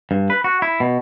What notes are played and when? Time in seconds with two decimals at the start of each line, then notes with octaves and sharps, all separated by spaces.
0.11 G2
0.30 B4
0.44 F#4
0.62 E4
0.80 B2